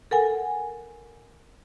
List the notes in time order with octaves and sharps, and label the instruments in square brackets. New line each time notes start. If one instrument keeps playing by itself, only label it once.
[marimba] A4 A#4 F#5 G#5